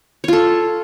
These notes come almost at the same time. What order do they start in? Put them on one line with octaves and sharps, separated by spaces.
C#5 F4 A4